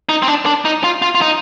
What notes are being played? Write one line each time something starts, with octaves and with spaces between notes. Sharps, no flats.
D#4
C4
D4
D4
D#4
F4
F4
F4
D#4